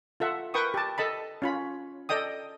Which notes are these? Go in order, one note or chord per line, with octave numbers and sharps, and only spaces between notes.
F4 A4 E5 F#5
A#4 B4 G5 C#6 D#6
G4 A5
A4 D#5 A5 B5
C#4 F4 B5
A4 D5 D#5 G5 D#6